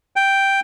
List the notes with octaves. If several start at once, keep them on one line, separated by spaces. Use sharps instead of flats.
G5